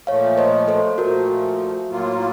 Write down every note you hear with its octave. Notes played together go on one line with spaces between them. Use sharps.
A#2 F3 A3 C#5 F5
C5 D#5
A4 C5
A#2 F3 A3 F#4 A#4
A2 F#3 A#3 F4